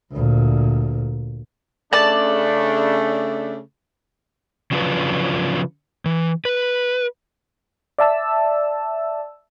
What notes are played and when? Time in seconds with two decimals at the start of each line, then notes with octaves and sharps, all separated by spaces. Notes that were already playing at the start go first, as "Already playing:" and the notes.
0.12 D2 A#2
1.93 C#3 A3 D4 D5 A5
4.71 C#3 F3 F#3 D4 F4 B4
6.05 E3
6.45 B4
7.99 D5 E5 A5 E6